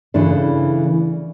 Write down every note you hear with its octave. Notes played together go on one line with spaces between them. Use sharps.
C#3 E3 A3 D4